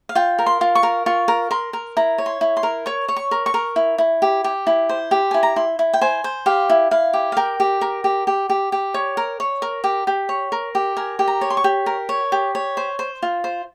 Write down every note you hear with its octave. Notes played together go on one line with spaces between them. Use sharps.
F5
F4 G5
A#4
C6
F4
C#6
A#4
F4 C#6
A#4
A#4 C6
A#4
E4 A#5
C#5
C6
E4
C6
A#4
C#5 C#6
C#5
C#6
A#4
C#6
A#4
E4
E4
G4
G4
E4
C5
G4
E4 G#5
A#5
E4 C6
E4
G5
C5 G#5
C5
G4 F5
E4
E4 F5
G4
F5
A#4 G5
G4
A#4
G4
G4
G4
G4
C#5
A#4
C#5
A#4
G4
G4
C#5
A#4
G4
A#4 G#5
G4
A#5
C#5
C6
C#6
G4
A#4
C#5
G4
C#5
C5
C5
F4
C5